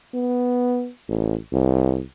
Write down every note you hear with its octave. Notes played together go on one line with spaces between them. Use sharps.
B3
A1
C2